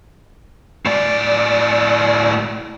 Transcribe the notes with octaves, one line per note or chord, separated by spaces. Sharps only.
A2 D5